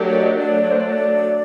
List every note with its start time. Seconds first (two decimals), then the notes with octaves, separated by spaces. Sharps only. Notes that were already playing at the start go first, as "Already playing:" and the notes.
Already playing: F#3 A3 D4 G4 A#4
0.08 D5
0.22 D#5
0.36 F#3 A3 D4 D5
0.71 C5
0.81 D5